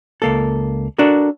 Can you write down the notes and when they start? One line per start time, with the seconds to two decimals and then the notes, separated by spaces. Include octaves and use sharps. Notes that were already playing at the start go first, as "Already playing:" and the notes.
0.22 C#2 A#3 A4
0.98 D4 F#4 A4 A#4